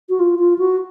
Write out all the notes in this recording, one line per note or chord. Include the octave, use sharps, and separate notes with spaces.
F#4
F4
F4
F#4